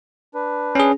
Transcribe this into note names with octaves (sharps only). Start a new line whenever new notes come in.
D4 B4
C#4 G#4